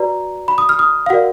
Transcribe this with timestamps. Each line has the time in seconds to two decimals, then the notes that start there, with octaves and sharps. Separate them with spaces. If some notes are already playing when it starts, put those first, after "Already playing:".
Already playing: F#4 B4 D5 A#5
0.48 B5
0.58 D#6
0.69 F6
0.79 D#6
1.06 F5
1.10 F#4 A#4 D5 F#5